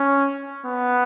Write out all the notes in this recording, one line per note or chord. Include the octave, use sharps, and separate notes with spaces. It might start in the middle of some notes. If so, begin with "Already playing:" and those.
Already playing: C#4
B3